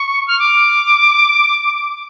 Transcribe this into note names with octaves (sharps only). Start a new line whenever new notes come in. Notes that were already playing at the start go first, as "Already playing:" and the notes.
Already playing: C#6
F6
D6